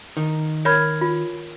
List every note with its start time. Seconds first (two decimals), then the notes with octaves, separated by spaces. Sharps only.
0.17 D#3
0.65 A#4 C#5 B5 F6 G#6
1.01 F4